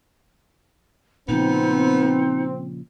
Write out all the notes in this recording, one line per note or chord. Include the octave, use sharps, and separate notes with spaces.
A#2 C#3 F3 B3 C4 D#4